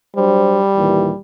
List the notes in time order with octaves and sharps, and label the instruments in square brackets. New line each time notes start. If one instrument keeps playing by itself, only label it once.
[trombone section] F#3 D4 C5 [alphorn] G3
[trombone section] D#2 A#2 E3